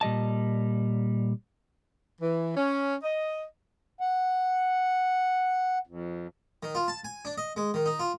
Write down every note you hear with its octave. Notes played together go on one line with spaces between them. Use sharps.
A#2 G3 D#5 A5
E3
C#4
D#5
F#5
F2
D#3
F4
A5
G#5
D4
D#5
G#3
D#3
D#4
F4